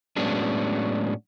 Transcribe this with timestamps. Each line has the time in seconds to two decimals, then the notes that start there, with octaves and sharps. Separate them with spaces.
0.16 A2 F#3 G#3 B3 C#4 D4